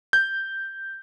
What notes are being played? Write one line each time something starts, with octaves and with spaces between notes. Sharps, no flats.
G6